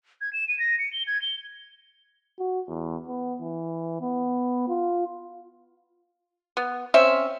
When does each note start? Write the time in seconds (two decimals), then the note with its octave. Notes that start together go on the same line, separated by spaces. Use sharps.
0.21 G#6
0.33 E7
0.48 D#7
0.59 A#6
0.79 C#7
0.93 G7
1.07 G#6
1.22 G7
2.39 F#4
2.68 E2
3.08 B3
3.40 E3
4.01 B3
4.68 F4
6.57 B3
6.94 C4 C#4 E5